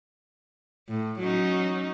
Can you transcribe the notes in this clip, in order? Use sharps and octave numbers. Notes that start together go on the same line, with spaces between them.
A2
F#3 C#4 D#4